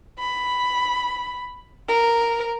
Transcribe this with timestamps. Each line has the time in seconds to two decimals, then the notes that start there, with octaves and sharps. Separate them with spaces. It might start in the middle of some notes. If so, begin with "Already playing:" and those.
0.19 B5
1.88 A#4